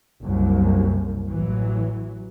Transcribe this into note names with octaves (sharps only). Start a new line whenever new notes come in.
F#1 C2 F#2
A1 E3 F#3